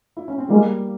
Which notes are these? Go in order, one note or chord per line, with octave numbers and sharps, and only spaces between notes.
E4
C#4
C4
G3 G#3 A#3